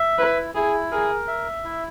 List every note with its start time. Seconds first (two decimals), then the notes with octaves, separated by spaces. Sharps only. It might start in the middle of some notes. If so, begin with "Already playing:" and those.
Already playing: E5
0.18 E4 B4
0.55 E4 G#4
0.92 G#4 A#4
1.27 E5
1.65 E4